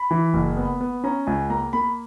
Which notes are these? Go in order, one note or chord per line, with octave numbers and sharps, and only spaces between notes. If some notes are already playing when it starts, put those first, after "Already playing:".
Already playing: B5
E3
F#1
B3
B3
C#4 A#5
C#2 G#5
A#3 A#5
A#3 B5